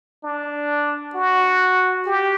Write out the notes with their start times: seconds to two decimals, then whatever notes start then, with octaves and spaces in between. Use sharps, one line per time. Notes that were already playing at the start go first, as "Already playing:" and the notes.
0.24 D4
1.15 F#4
2.06 G4